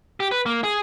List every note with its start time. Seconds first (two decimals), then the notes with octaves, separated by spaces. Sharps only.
0.20 G4
0.32 B4
0.46 A#3
0.64 G#4